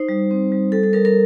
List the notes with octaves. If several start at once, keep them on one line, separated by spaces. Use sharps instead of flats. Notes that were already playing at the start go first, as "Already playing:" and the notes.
Already playing: D#4 C5
G3
C4
G3
G3 A4
A4
G3 A#4
A#4